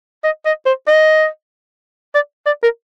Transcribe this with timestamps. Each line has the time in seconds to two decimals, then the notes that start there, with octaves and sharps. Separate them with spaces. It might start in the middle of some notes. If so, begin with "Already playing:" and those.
0.24 D#5
0.45 D#5
0.66 C5
0.87 D#5
2.14 D5
2.46 D5
2.63 A#4